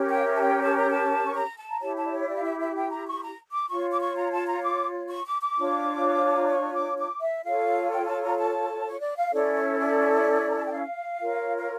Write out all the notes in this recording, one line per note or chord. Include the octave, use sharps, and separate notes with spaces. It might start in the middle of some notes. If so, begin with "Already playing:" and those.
Already playing: C#4 G4 A#4 C#5
G5
F5
E5
A5
G5
A5
A#5
A5
C#6
A#5
A5
A#5
E4 G4 C#5 A5
A5
D5
C#5
D5
F5
E5
E5
G5
A#5
C#6
A#5
D6
F4 C#5 C#6
D6
C#6
A#5
A5
A#5
D6
C#6
D6
D6
D4 F4 C#5
A5
A#5
C#6
D6
D6
E5
F4 A4 C#5 F5
G5
A5
A#5
A5
C#5
D5
F5
C#4 E4 A4 C#5 D5
C#5
D5
A#5
A5
G5
F5
F4 A#4 C#5
F5